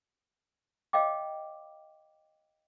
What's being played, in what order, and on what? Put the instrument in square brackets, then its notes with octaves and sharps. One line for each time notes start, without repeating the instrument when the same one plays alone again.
[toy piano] C#5 D#5 F5 G5 D6